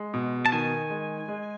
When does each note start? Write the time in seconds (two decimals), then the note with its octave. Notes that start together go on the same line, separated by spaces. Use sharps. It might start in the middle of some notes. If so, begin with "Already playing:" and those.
Already playing: G#3
0.14 B2
0.46 A5
0.52 D#3 G#5
0.90 G#3
1.28 G#3